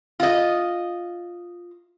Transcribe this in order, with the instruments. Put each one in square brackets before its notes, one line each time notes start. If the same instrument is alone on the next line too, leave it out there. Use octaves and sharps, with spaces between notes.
[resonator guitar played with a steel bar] F4 D#5